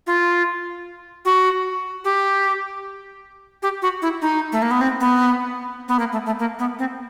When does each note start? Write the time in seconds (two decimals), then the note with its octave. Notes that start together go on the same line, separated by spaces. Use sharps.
0.07 F4
1.25 F#4
2.04 G4
3.63 G4
3.82 F#4
4.02 E4
4.22 D#4
4.52 A3
4.62 A#3
4.71 B3
4.81 C4
5.01 B3
5.88 B3
5.99 A#3
6.12 A3
6.26 A3
6.39 A#3
6.59 B3
6.79 C4